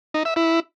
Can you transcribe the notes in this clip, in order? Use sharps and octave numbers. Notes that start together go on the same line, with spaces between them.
D#4
E5
E4